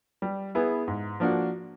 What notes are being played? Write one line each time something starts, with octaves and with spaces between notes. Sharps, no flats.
G3
B3 E4 G#4
G#2
F3 A#3 D4 F#4